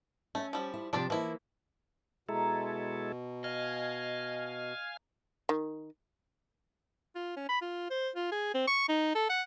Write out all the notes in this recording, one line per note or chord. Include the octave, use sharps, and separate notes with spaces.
A3 C#4
F3 G3
E4
C3 F3 D4 F4 D5
E3 F3 A#3 E4
B2 G#3 E4 A4 A#5
D#5 F5 G#5
D#3
F4
C#4
B5
F4
C5
F4
G#4
C4
C#6
D#4
A4
F#5